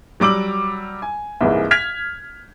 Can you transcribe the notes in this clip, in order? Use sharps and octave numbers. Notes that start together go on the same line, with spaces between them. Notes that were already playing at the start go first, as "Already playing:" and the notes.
F#3 G3 D6 E6 F#7
G#5
C2 G#2 C3 E3 G#3 A#3
F6 G#6 B6 F7